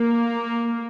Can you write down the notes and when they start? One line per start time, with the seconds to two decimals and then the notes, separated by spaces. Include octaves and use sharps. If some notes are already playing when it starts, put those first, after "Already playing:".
Already playing: A#3